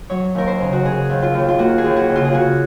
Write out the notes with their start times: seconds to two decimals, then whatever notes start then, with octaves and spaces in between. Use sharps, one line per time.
0.10 F#3 C#5
0.35 D#2 A#4
0.47 C5
0.60 C#3
0.73 F#4
0.85 C#3 G#4
1.10 D#2
1.22 F4
1.34 D#2
1.49 F4
1.59 A#3 F#4
1.78 G#4
1.84 D#2
1.96 F#4
2.10 C#3
2.16 F4
2.25 G#4
2.33 C#3 F#4